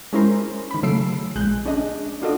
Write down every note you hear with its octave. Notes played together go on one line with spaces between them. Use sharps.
G#3 C#4 E4 A#4 C5
D#3 B5
C#3 F#3 A3 E6 C7 D7
A#1 G#3 F#6 G6
C#4 D4 G#4 D#5
D4 F4 F#4 A4 D5 D#5